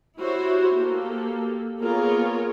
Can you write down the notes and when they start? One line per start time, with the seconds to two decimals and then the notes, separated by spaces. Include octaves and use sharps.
0.19 E4 F#4 G4 C5 C#5
0.74 A#3 G4 A4
1.80 A#3 B3 F4 G#4 A#4 C#5